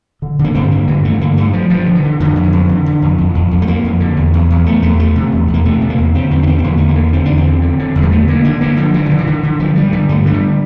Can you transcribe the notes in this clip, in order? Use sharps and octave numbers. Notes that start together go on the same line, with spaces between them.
D3
D3
A#3
G2 C4
D3 A#3
G2 E3
D3 A3
G2 A#3
G2 A3
G2 F3
G2 F3
D3
E3
D3
F2 D3
F2
E3
F2
D3
D3
F2
F2
F2
F2
A3
F2 A#3
F2
D3
E2
E2
E2
E2 A3
E2 A3
E2 A3
C3
E2
E2
A#3
C3 A3
C3
A#3
E2
D3 C4
E2 C4
D4
D3 C4
C4
E2 A#3
E2 A3
A#3
D3
D3 C4
E2 D4
C4
D3
D3
D3
E2
G3
D3 A3
D3 A#3
D3 D4
G2 A#3
D3 F3
G2 E3
D3 F3
E3
D3
D3
G2 F3
G2 G3
D3 G3
G2 A3
D3 A3
G3